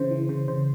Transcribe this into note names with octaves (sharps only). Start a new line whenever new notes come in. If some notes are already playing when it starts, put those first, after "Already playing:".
Already playing: C#3 E3 C5
E3
C#3 C5
C#3 C5